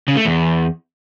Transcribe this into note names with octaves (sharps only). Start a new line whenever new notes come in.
C#3
A3
E2